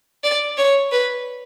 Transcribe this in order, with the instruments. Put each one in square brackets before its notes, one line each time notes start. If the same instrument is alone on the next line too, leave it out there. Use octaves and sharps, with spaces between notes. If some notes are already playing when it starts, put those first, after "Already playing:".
[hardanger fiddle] D5
C#5
B4